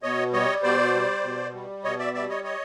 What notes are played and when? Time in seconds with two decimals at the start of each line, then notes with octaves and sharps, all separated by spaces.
0.03 B2 C#5 D#5
0.33 G3 C#5 D#5
0.63 B2 C5 D5
0.94 G3
1.24 B2
1.53 G3
1.84 B2 C#5 D#5
1.99 D5 E5
2.14 G3 D5 E5
2.29 C#5 D#5
2.44 C#5 D#5